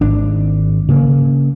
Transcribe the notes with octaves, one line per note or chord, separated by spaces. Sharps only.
G#1 D4
C#3 A#3